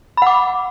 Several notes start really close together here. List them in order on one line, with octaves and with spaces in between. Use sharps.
B5 F#5 D6